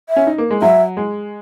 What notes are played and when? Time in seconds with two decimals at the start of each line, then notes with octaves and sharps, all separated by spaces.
0.09 E5
0.16 C#4
0.27 D#4
0.38 A#3
0.51 G#3
0.62 F#3 E5
0.97 G#3